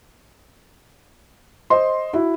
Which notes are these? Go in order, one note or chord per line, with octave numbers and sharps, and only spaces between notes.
C5 D#5 C6
E4 F#4 E5